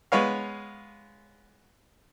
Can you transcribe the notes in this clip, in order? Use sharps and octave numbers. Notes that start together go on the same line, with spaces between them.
G#3 B3 C#5 F5